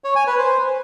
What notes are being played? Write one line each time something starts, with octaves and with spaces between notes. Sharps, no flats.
C#5
G#5
B4
C5